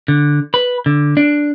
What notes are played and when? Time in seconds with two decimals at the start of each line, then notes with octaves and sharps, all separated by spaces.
0.08 D3
0.54 B4
0.86 D3
1.17 D4